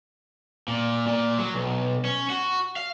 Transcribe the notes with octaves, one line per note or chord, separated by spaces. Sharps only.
A#2
A#2
F#3
B1
C#4
F#4
F5